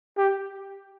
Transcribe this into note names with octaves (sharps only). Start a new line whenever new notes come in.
G4